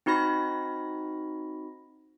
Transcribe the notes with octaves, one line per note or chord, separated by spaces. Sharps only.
C4 D#4 F#4 B5 A#6